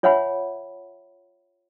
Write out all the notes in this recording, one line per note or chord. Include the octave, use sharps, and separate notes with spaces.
F4 C#5 E5 F#5 G#5 B5